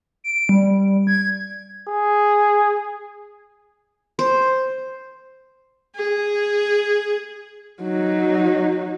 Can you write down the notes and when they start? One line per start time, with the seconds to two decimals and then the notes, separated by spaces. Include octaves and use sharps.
0.24 D7
0.49 G3
1.07 G#6
1.88 G#4
4.19 C5
5.95 G#4
7.81 F#3 D#4